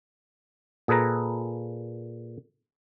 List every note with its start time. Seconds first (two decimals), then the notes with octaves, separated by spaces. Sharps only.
0.88 A#2 G#4 A4 B4 A#5